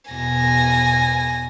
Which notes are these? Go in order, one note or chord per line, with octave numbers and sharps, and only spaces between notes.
E2 B2 G#5 A#6